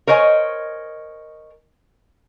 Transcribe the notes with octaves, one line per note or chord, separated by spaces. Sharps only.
A#4 C5 C#5 D#5 G#5